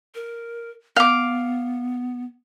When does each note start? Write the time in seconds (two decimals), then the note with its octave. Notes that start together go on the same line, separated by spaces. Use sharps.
0.15 A#4
0.96 B3 F5 D6